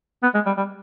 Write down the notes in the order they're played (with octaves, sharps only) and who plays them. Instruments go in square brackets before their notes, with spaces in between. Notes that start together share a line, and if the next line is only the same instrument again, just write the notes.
[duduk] B3
G#3
G3
G3